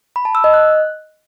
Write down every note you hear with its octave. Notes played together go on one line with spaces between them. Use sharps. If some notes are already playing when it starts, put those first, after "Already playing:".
B5
A5
E6
D#5
F#6